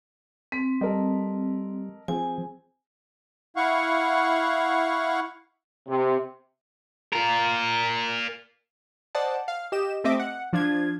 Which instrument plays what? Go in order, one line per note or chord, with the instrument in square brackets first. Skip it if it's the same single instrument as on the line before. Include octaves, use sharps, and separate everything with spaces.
[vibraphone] C4 [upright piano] B6
[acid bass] G3 [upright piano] A4 A#4 D#5
[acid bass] F3 [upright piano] C4 G#4 [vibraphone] G#5
[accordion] E4 F5 F#5 C#6
[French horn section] C3
[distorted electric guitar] F4 A#4
[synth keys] C5 D5 D#5 F#5 A5
F5
G4 D#5 E7
A3 C4 D#5 E5 D6
F#5
F3 D4 F4 G#6